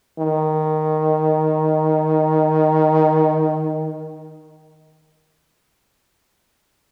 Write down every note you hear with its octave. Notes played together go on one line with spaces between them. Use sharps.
D#3